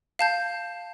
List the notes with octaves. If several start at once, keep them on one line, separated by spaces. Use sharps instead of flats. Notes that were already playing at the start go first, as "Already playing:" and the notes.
F5 A5 G6